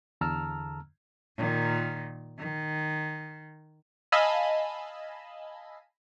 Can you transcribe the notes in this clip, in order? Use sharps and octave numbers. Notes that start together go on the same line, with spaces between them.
E2 D3 A5 A#5 E6 F6
A#2 D#3
D#3
D#5 F5 G#5 A5 B5 E6